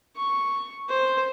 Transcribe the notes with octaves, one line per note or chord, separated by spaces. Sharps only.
C#6
C5